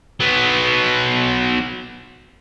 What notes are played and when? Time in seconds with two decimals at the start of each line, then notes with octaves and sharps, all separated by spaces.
0.20 F#3 B3